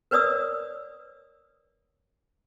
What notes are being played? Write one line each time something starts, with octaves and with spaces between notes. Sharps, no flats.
A#4 B4 C#5 D5 D#6 E6